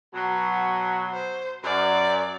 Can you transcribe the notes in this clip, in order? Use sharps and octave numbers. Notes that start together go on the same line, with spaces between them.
B2 F#3
C5
F#2 D5